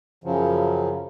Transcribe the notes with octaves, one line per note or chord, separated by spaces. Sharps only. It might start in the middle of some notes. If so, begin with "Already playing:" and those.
F#2 C#3 F3 F#3